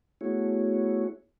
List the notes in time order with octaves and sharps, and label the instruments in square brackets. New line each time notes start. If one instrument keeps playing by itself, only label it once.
[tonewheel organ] A3 B3 E4 F#4 G#4 C#5